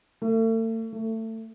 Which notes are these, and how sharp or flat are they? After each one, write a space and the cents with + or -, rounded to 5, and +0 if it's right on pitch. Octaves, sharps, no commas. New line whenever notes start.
A3 +40
A3 +25